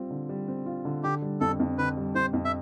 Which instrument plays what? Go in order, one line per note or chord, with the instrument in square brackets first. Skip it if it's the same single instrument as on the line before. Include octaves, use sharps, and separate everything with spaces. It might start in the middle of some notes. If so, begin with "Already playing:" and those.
Already playing: [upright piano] G3 C4 F4
D3
G3
C4
F4
D3
[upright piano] D3 [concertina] G4
[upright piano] G3
[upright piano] F2 [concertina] A4
[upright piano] F2
[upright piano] D3 [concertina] B4
[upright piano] G3
[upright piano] F2 [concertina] C5
[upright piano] F2
[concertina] E5